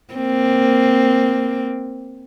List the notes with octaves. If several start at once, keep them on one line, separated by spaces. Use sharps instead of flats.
A#3 C4